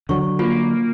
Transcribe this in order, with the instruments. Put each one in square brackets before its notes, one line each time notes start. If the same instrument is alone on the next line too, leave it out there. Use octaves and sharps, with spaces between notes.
[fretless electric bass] D3 F#3 [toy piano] C#6
[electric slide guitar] A#3 [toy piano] F4